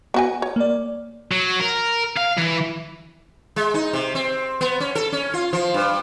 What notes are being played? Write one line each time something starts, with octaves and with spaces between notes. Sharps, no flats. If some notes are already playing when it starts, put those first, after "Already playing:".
B3 F#4 G#5
C#5
A#3 D5
F#3
A#4
F5
E3
G#3
D#4
C3
C4
B3
C#4
A4
C#4
F4
F3
G2